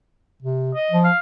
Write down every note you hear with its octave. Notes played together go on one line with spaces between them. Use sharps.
C3
D#5
F3
F5